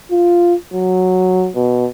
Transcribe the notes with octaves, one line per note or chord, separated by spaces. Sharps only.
F4
F#3
B2